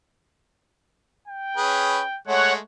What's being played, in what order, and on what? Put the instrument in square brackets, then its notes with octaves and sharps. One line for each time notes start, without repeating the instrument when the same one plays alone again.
[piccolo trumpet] G5
[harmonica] C#4 G#4 B4
[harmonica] G#3 A3 [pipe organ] C#5 F#5